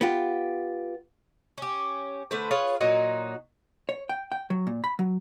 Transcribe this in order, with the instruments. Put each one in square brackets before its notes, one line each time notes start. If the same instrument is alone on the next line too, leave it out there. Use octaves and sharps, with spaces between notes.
[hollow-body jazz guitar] B3 F4 G4
[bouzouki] C#4 G4
D3 A3 B4 C5
F4 G#4 B4 C#5
A#2 F#3 D#4 F#4
[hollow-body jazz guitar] C#5
G5
G5
F#3
A#2
B5
F#3